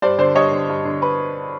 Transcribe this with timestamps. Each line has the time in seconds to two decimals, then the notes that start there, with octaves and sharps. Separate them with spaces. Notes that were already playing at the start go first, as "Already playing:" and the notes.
0.02 G2 C5 D5
0.18 D3 C5 D5
0.35 G2 C#5 D#5
0.52 D3
0.69 G2
0.85 D3
1.02 B4